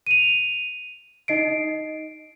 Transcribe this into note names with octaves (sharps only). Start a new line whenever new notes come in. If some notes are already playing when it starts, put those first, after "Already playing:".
D#7 F7
D#4 D#5 C7 D7